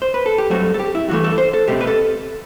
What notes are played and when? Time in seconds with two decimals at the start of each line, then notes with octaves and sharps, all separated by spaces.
0.02 C5
0.14 B4
0.26 A4
0.38 G4
0.50 G2 F#3 A3 C4 F#4
0.74 A4
0.79 G4
0.95 E4
1.08 G2 E3 A3 F#4
1.24 A4
1.38 C5
1.54 A4
1.68 B2 A3 C4 G4
1.81 B4
1.87 A4